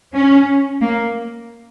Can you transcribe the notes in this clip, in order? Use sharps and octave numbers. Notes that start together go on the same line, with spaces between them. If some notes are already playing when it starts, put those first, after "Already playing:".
C#4
A#3